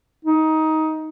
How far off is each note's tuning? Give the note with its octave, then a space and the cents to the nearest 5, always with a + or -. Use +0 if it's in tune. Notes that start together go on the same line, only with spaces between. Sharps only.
D#4 +15